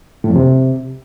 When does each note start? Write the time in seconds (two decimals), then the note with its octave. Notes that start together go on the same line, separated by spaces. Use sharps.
0.24 A2
0.30 F2
0.36 C3